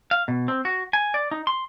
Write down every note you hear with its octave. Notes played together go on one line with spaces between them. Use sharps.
F5
B2
C4
F#4
G#5
D5
D#4
C6